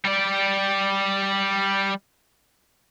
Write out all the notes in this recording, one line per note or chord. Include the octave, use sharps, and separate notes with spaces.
G3 D5